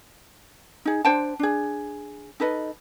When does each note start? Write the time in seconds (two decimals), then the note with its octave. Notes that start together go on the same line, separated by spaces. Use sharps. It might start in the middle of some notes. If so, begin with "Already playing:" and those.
0.85 D#4 G#4
1.05 D4 C5 G5 A5
1.39 D4 G#4
2.40 D#4 A4 B4 D#5